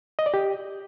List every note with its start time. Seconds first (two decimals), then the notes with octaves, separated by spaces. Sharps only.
0.19 D#5
0.26 D5
0.34 G4